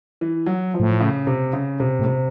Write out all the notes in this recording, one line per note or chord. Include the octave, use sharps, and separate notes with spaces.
E3
F#3
F3
A2
C#3
C3
C#3
C3
A2
C3